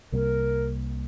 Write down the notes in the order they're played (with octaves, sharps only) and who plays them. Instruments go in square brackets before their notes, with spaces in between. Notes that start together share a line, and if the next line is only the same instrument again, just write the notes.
[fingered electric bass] C2 C3 G3 A#3 [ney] A#4